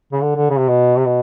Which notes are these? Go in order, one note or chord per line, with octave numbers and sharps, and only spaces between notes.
C#3
D3
D3
C#3
C3
B2
C3
B2